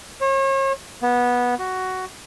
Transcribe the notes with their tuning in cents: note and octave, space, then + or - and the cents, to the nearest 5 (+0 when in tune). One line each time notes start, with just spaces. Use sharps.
C#5 -40
B3 -15
F#4 +10